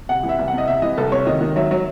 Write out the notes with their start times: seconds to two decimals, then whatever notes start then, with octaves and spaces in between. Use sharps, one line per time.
0.09 C3 F#5
0.23 E3
0.29 E5
0.39 C2
0.48 F#5
0.53 C3 D#5
0.67 C3 E5
0.82 E3 D#5
0.98 C2 A4
1.12 C3 C#5
1.27 D#3 D#5
1.41 D#3
1.56 F#3 E5
1.71 F#3